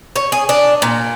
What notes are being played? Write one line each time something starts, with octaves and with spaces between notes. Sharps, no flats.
C#5
G#4
D4
A#2